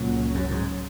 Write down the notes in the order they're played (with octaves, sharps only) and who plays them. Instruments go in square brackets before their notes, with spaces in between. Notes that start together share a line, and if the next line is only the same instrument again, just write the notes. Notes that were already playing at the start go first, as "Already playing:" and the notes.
Already playing: [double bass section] C#2 C#3 F#3 C#4 [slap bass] A#2
[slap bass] F#2
G#2